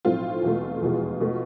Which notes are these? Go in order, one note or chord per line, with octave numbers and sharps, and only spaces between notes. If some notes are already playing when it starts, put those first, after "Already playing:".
B1 A2 F3 A3 C4 F4
E2 B2 A3
F1 E2 B2 G#3
B2 A3